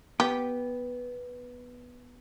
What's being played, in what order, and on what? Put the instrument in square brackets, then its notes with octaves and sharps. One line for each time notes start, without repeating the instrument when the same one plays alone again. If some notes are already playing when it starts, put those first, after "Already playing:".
[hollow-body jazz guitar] B3 [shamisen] G4